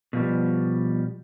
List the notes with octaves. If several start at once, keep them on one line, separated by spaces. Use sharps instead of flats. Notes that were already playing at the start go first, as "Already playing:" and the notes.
B2 F3 G3